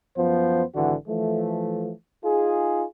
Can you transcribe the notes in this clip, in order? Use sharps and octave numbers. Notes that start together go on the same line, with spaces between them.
F#2 F3 B3 C5
G#1 D3 E3 F#4
E3 F3 A3
D#4 F4 G#4